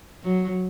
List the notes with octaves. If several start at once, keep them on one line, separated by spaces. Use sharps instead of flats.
F#3